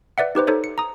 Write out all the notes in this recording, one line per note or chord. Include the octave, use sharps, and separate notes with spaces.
B4 D5 E5 F#5
D#4 G4 B4 C5
D#4 A4 C5 C#5
C#7
A#5 D#6